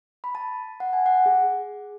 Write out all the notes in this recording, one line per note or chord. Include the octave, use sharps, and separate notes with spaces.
B5
A5
F#5
G#5
F#5
G#4